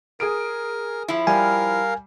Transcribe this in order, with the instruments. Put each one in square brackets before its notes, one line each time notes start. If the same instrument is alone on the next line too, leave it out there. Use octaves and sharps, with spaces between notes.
[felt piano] G#4 D#6 D7 [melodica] A#4
[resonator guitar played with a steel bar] F3 E4
[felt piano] G3 [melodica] A#4 F5 [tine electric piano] G#5